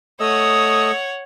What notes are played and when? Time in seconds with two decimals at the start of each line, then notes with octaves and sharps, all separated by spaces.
0.20 A3 C#5 D#5 F#5 D#6 E6